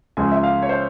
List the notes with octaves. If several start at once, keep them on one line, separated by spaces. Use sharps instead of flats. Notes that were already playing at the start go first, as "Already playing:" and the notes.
C#2 C#3 F3 G#3 G#5
E5
F5
C#5
C5